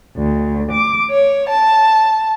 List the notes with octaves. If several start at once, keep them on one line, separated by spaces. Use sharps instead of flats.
D2
D6
C#5
A5